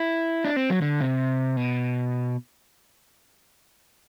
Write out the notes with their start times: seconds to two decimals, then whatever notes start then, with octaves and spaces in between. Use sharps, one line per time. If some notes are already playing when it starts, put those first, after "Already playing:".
Already playing: E4
0.45 D4
0.56 C4
0.70 F#3
0.82 D3
1.01 C3
1.57 B2